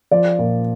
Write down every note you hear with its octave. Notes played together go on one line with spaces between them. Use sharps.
F3 D5
A#2